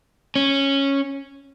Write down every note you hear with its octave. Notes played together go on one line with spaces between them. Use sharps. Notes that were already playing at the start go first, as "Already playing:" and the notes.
C#4